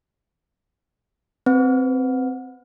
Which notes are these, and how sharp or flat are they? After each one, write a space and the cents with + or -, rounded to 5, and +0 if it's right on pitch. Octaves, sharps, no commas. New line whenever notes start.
C4 -5 B4 +20